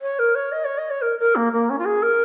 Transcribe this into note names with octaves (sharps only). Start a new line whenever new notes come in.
C#5
A#4
C#5
D#5
C#5
D#5
C#5
A#4
A#4
A#3
A#3
C#4
F4
G#4
A#4